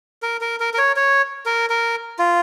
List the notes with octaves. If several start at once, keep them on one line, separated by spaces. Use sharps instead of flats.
A#4
A#4
A#4
A#4
C#5
C#5
A#4
A#4
F4